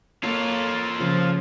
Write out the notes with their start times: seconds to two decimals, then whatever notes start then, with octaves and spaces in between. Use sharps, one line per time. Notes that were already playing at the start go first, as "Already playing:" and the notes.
0.24 A#3 F4 A4 C#5
1.00 C#3 F3